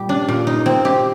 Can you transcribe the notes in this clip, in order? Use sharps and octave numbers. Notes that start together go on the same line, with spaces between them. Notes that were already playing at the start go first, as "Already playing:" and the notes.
Already playing: A#2 G3 G4
D4
A#2
D#4
C4
G4